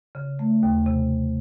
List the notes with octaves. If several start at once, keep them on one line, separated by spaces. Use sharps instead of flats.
C#3
A3
D#2
C3